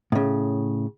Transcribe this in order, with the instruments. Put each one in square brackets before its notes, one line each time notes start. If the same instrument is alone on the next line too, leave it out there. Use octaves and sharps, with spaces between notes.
[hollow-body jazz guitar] A2 C#3